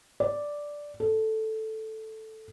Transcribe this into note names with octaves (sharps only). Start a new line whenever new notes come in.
D5
A4